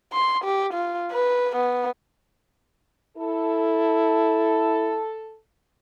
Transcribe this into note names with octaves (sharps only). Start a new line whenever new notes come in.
C6
G4
F4
B4
B3
E4 A4